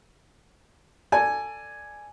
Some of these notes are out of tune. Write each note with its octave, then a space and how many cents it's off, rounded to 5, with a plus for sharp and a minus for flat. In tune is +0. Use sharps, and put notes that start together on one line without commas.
A4 +20 D5 +15 G#5 +0